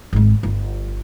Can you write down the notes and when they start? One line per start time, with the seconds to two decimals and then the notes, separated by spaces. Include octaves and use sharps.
0.13 G#1 G#3
0.43 G1